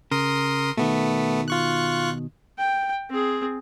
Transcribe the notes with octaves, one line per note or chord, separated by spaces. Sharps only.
C#3 A#4 C6 D#6
B2 D#3 A3 B3
F4 C#6 F#6
G5
C4 G#4